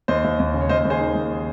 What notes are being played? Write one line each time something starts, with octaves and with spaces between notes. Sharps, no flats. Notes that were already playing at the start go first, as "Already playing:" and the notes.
D#2 C5 D#5
D#2
D#2
C#3
C#5
D#2 C5 D#5
D#2
G#4 C5
D#3
D#2